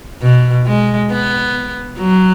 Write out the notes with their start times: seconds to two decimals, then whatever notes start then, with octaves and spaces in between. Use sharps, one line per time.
0.22 B2
0.66 G#3
1.10 B3
1.98 F#3